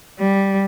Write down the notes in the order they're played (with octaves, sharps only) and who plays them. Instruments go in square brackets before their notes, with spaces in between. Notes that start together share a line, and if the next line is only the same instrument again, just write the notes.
[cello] G3